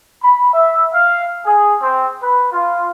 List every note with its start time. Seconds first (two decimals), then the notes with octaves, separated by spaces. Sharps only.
0.22 B5
0.53 E5
0.93 F5
1.45 G#4
1.82 C4
2.21 B4
2.52 F4